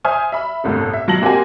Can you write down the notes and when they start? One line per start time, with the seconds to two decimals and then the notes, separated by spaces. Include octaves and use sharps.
0.04 C5 E5 G#5 D#6 F6
0.32 E5 B5
0.64 G1 C2 A2 D3
0.93 E5
1.07 B2 F#3 F4 A5 A#6 F#7
1.22 A#3 C4 F#4 G4 G#5